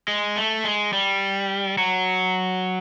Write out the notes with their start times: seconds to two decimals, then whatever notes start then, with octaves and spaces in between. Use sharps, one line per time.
0.08 G#3
0.36 A3
0.64 G#3
0.93 G3
1.78 F#3